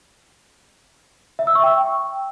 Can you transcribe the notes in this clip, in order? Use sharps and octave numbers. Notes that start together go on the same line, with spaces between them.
E5
E6
C#6
G5